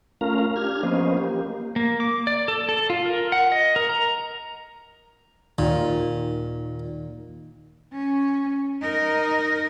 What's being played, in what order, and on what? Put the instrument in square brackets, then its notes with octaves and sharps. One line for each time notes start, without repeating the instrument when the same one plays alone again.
[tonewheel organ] A3 C#4 F4 A#4 F5 A#5
D4 G4 F6 G#6
F3 A#3 B3 C#4 C5 D#5
A#3 G4
[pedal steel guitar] A#3
D6
D5
A4
A4
F4
A#4
F#5
D#5
A#4
A#5
[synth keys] D#2 D#3 [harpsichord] A#2
[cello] C#4
D#4 A#4